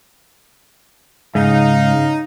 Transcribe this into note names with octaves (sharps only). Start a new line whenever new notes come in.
G#2 C#3 D#4 F5